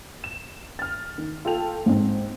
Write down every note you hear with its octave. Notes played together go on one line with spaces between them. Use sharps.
E7
F6 A6
D#3
F4 A4 G5 F7
G#2 C4